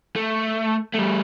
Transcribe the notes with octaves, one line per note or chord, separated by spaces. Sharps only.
A3
G3 A3